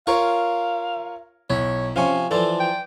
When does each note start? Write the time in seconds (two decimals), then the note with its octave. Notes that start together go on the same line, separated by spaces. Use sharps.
0.07 F4 A#4 C#5 F5 C#6
1.50 B1 E4 C#5
1.96 C3 F3 C#4 F5 G#5 C#6
2.31 E3 F3 A4 D5 A5 C6
2.60 G5